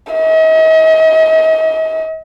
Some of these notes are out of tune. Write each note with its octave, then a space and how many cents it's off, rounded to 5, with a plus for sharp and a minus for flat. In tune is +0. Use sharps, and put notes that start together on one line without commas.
D#5 +40